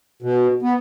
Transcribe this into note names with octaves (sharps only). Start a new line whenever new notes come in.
B2
B3